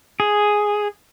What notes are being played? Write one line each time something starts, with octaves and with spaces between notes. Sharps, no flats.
G#4